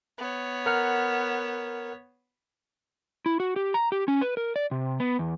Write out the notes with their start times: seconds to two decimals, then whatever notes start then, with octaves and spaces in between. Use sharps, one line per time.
0.18 B3 C#5
0.66 A#4 F#5 F6
3.26 E4
3.40 F#4
3.56 G4
3.74 A#5
3.92 G4
4.08 C#4
4.21 B4
4.37 A#4
4.56 D5
4.71 C3
5.00 B3
5.19 E2